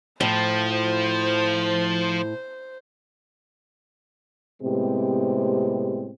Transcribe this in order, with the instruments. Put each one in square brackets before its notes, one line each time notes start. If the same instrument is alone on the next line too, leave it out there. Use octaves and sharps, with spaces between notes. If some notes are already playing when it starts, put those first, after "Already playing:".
[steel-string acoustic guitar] A2 [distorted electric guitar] F3 [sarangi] C5
[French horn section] A2 C3 G#3 B3 C4 G4